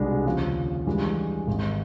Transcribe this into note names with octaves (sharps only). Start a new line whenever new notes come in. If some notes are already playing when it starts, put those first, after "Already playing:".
Already playing: C2 B2 G#3 B3 D4
D#2 C#3 F3
G2 E3 G#3
G#1 G#2 D#3